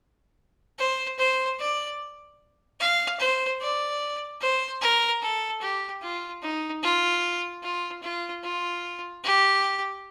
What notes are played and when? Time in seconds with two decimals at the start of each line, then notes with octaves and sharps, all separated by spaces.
0.79 C5
1.19 C5
1.60 D5
2.80 F5
3.20 C5
3.61 D5
4.41 C5
4.82 A#4
5.22 A4
5.62 G4
6.02 F4
6.42 D#4
6.83 F4
7.63 F4
8.03 F4
8.43 F4
9.24 G4